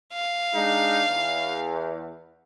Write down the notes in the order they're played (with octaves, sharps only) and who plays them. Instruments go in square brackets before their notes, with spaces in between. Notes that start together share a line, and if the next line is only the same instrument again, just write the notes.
[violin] F5
[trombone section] G#3 D4 D#4
E2